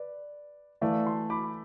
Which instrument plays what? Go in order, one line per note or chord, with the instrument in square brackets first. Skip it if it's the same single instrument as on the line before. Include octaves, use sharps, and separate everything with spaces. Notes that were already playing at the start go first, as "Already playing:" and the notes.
Already playing: [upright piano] B4 D5
[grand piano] E3 A3 E4 [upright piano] D5 F5
[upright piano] A5 C6
B5 D6